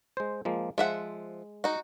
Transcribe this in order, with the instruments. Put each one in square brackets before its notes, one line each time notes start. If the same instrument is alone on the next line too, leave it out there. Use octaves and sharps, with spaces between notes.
[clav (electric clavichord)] G#3 C5
F3 G#3 A#3
[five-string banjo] F3 E5 F#5 [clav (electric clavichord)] G#3
[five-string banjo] D#4 F#4